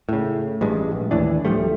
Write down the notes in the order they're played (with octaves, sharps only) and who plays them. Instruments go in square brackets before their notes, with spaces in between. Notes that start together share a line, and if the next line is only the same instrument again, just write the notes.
[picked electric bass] A2 C#3
A1 G2 G#3
A#1
D#2 A2 E3 D4
D1 F3 G3 A3